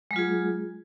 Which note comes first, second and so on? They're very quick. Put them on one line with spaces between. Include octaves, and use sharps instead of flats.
G#3 F#3 F4 G#4